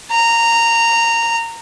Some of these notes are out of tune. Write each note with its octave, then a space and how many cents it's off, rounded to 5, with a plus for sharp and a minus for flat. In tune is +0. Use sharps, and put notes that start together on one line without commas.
A#5 -15